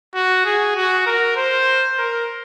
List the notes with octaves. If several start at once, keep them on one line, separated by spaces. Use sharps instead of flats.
F#4
G#4
F#4
A#4
C5
A#4